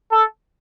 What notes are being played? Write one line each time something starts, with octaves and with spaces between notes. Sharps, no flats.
A4